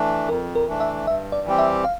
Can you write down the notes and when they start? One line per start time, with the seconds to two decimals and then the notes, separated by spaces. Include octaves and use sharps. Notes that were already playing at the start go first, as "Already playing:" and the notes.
Already playing: E3 A3 D4
0.28 F2 A#4
0.55 A#4
0.68 E3 A3 D4
0.80 E5
1.07 G2 E5
1.32 D5
1.45 E3 G3 C4 G4
1.58 E5
1.84 F5